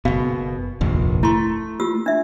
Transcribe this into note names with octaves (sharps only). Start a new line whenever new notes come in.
F#1 B2 F5
F1 A#1 D#2
A3 E4 C6
F4 G4 E6
D4 E5